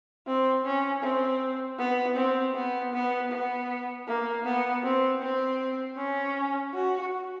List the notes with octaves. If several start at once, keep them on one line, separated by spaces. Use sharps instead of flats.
C4
C#4
C4
B3
C4
B3
B3
B3
A#3
B3
C4
C4
C#4
F#4